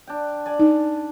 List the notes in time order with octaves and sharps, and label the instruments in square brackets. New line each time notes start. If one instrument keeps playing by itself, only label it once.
[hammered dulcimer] D4 G5
D5 G#5
[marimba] D#4